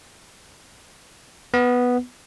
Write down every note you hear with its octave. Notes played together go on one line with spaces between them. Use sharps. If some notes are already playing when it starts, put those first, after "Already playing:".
B3